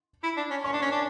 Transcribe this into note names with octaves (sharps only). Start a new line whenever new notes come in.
E4
D4
C#4
C#4 C#6
D4
C#4
D4